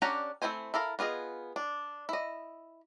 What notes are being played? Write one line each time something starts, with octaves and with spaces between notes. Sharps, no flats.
C#4 D4 G4 F#5 A#5
A3 C4 E4 C5 G#5
E4 A4 A#4 F5
B3 F4 G#4 D#5
D4
E4 D#5